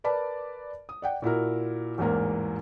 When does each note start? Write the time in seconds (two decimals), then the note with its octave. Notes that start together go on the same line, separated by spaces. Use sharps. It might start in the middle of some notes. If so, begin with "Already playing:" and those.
0.04 A#4 B4 D5 A5 B5
0.89 D#6
1.02 D5 F#5 G5
1.22 A#2 E4 F#4 A#4
1.98 A1 E2 G#2 A#3 A#4